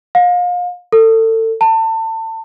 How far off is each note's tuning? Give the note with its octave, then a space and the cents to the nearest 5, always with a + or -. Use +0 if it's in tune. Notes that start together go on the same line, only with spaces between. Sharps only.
F5 +35
A4 +30
A5 +30